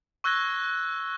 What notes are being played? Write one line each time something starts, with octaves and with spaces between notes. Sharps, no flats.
C#6 E6 F#6 G#6 A#6 G7